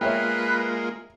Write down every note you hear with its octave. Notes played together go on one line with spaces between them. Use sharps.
G#3 A#3 F4 B4 C#5 E5 G5